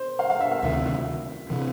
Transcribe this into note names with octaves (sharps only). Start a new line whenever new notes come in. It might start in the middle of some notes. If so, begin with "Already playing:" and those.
Already playing: C5
F5
F5
E5
F5
D2 C3 D#3 E5
C3 E3